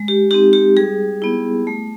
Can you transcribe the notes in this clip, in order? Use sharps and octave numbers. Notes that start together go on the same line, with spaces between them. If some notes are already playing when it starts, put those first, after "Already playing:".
Already playing: G#3
G4
C4 D#4 G4
G4
G3 G#4
B3 E4
A3